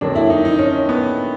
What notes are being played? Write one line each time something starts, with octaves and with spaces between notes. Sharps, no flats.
F2 D3 F#3 A#3 D4
E4
D#4
D#4
C#4
B3